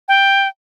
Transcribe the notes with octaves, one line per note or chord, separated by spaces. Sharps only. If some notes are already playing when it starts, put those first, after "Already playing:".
G5